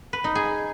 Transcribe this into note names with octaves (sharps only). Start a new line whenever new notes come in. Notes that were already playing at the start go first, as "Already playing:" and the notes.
B4
D#4
G#4